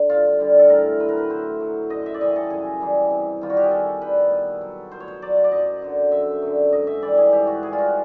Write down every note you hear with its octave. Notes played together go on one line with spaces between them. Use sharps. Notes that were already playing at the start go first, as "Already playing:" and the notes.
Already playing: D3
G2 F4
D3 G3
A4
A2 A#4
F#3 B4
A#4
B4
A2 C5
F#3
F#2 D#5
E5
D5
C#3 E3 G3 D#5
A4
F#2 G#4
C#3 E3 G3
C3
D#3 G3 F4
F#4
G4
G#4
C3 A4
D#3 G3 B4
B2
F#3
B2 C5
C#5
C5
F#3 D5
D5
F#2 D#5
D3 F#3
F#2 E5
D3 F#3
G#2 D#5
E5
E3 G3 D5
G#4
G#2 G4
F#4
E3 G3 G#4
F4
F#4